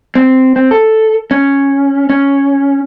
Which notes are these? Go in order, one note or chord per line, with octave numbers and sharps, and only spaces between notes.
C4
C4
A4
C#4
C#4